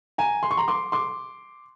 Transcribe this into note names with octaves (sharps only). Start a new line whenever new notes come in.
G#5 A#5
C6
C#6
A#5 C6
C6 D6
C6 D6